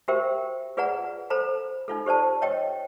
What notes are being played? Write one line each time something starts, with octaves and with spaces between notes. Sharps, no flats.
F#4 G4 A#4 C5 E5 G5
F4 G#4 B4 D5 F#5 A#5
A4 C5 A#5 B5
D#4 F4 A4
G4 C5 D5 A5
C#5 D#5 G5